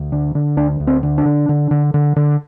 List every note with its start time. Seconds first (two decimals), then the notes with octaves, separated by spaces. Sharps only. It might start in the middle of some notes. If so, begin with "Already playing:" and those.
Already playing: D2
0.12 D3
0.35 D3
0.57 D2 D4
0.80 D2
0.87 C4
1.03 D3
1.18 D4
1.25 D3
1.49 D3
1.71 D3
1.94 D3
2.16 D3